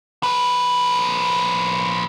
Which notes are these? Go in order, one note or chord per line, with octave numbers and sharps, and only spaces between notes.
F3 B4